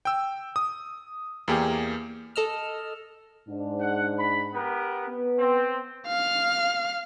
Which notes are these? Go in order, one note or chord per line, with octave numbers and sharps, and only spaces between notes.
G5 E6
D#6
E2 A#3 G4 G#4
A4 D#5 E6 F6
G#2 D4
F#5
B5
B3 G4 A#4
B3
C4
F5 F6